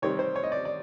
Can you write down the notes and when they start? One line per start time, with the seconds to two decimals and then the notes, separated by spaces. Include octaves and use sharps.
0.02 C3 D#3 G3 C4 C#5
0.19 C5
0.36 C#5
0.43 D#5
0.52 D5
0.65 D5